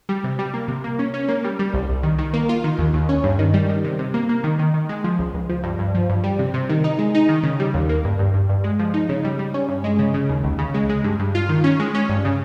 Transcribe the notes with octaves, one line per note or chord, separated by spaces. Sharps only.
G3
C3
G3
A#3
C3
A#3
C#4
C#4
A#3
G3
G3
C2
C2
D#3
D#3
A#3
F4
D#3
D#2
D#2
C#4
G2
D#3
G3
D#3
C3
C3
A#3
A#3
D#3
D#3
D#3
G#3
F3
C#2
C#2
F3
G2
G2
F3
G2
G3
C3
C3
D#3
D#4
G#3
D#4
D#3
C#3
G3
D#2
A#3
G2
G2
G2
G2
G#3
F3
D#4
C#3
G3
G3
C#4
G2
G#3
C#3
C#3
D#2
C#2
C#3
G#3
G#3
G2
G2
F4
D#3
C#4
G#3
C#4
G2
C#3